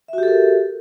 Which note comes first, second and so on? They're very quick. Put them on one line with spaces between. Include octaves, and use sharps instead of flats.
E5 F#4 G4 A4 A#4